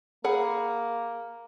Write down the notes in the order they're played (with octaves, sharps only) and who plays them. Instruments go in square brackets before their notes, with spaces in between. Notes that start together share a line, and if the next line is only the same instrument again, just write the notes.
[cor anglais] A#3 [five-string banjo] G#4 F#5 B5